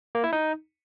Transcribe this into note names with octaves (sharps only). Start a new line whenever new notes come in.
A#3
E4
D#4